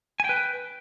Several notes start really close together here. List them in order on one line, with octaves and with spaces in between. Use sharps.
G#5 G5 B4